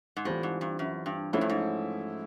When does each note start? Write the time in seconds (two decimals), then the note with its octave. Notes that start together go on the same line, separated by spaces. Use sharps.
0.17 G#2
0.25 A2 E3 G3 C4 F4
0.43 G#2
0.61 G2
0.79 F#2
1.06 G2
1.33 G#2 F3 A3 C#4 E4
1.41 G2
1.50 G#2